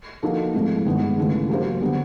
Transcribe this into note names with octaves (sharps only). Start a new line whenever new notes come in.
F3 A#3 D#4 F#4 A4
G#2 F3 A3 C4 E4
G2 D#3 G#3 B3
D#2 C#3 E3 A3
F#3 A#3 D4 G4 C5
D3 G3 B3